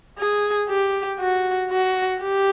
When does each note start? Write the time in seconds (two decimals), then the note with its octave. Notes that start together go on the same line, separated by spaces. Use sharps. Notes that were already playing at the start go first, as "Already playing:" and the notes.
0.19 G#4
0.69 G4
1.20 F#4
1.70 F#4
2.21 G4